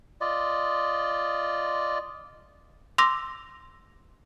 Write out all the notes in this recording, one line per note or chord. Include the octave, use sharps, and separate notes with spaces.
F4 D5 D#5
C6 D6 E6 A#6